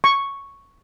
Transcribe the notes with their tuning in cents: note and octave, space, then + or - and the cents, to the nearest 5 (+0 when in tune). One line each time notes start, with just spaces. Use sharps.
C#6 +0